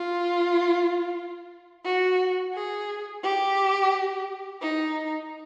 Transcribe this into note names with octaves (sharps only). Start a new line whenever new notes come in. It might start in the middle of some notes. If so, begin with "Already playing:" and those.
Already playing: F4
F#4
G#4
G4
D#4